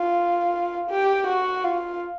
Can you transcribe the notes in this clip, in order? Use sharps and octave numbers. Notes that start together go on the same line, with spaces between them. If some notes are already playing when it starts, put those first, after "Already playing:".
Already playing: F4
G4
F#4
F4